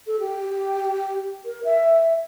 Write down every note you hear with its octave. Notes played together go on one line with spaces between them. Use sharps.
A4
G4
A#4
E5